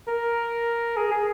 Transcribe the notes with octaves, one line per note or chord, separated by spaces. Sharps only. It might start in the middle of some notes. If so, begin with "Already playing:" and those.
A#4
G#4
G#4